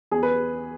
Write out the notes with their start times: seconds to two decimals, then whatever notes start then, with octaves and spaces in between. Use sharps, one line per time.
0.11 E2 G#4
0.23 B4